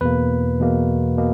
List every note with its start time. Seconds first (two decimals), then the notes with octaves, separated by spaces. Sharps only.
0.01 E2 B2 A#3 B4
0.60 E2 B2 A#3
1.17 B2 A#3